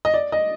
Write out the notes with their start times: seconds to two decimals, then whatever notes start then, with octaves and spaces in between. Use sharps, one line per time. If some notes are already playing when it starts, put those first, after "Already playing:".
0.05 D#5
0.14 D5
0.32 D#5